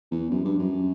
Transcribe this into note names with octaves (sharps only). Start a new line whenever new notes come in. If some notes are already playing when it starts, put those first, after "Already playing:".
E2
F#2
G2
F#2